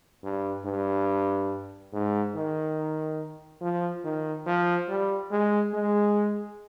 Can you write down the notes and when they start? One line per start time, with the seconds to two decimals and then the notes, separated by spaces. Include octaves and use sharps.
0.24 G2
0.65 G2
1.92 G#2
2.35 D#3
3.61 F3
4.04 D#3
4.46 F3
4.89 G3
5.31 G#3
5.74 G#3